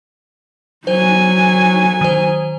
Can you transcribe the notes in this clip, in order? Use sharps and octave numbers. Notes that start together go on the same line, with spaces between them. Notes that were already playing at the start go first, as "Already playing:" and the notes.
F#3 C5 G#5
D#3 C5